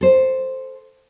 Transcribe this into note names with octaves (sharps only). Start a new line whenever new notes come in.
A4 C5